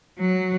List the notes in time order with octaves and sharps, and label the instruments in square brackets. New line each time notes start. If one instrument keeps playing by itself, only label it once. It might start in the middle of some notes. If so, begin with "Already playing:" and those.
[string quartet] F#3